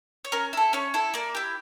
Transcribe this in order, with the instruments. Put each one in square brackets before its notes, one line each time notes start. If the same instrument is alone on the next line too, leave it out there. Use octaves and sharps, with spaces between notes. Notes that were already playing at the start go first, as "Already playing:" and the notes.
[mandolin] C#5
C#4 A#4
E4 A4
C#4 C#5
E4 A4
A#3 D5
E4 G4